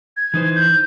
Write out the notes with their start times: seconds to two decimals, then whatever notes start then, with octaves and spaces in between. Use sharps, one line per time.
0.17 G#6
0.34 E3 D#4 C5
0.56 G6